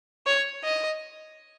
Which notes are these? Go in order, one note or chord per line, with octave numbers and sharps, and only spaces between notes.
C#5
D#5